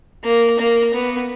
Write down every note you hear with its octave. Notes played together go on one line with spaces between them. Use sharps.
A#3
A#3
B3